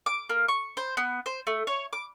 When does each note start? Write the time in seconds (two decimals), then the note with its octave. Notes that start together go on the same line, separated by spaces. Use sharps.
0.06 D6
0.29 A#3
0.48 C#6
0.77 C5
0.97 B3
1.26 C5
1.47 A3
1.67 C#5
1.93 D6